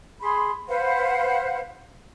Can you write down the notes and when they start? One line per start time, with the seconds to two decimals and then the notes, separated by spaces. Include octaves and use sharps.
0.21 G#4 B5 C6
0.68 B4 C5 F5 F#5